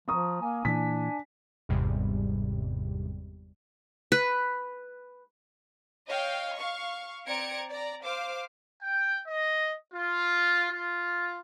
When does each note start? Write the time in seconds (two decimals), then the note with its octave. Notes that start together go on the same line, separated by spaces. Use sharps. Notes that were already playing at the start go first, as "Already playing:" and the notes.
0.08 F3 A#5 C#6 D#6
0.41 A#3 G#5
0.65 A#2 E3 D4 B6
1.69 G1 E2 G#2 C3 G3
4.12 B4
6.07 C#5 D#5 F5 G5
6.55 F5 C#6
7.27 C4 D5 A#5 G#6 C#7 D7
7.69 D5 A#5
8.03 C5 F5 D6
8.82 G5
9.27 D#5
9.94 F4
10.70 F4